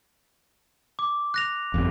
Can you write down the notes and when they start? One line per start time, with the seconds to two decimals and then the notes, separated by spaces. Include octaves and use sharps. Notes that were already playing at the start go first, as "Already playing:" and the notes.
0.99 D6
1.34 F#6 A#6 F7
1.74 G1 F2